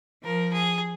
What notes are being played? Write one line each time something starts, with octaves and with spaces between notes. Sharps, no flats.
F3 A#4
G#4